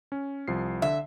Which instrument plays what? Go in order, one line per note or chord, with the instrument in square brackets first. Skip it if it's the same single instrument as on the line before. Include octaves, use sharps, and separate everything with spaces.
[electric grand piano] C#4
C2 F3 C7
[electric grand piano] D3 [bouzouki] E5